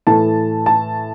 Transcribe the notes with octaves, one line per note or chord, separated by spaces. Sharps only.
A2 E3 A3 A5
A5